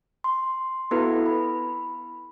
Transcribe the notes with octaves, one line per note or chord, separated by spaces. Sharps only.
C6
B3 E4 F#4 A4 B4
B5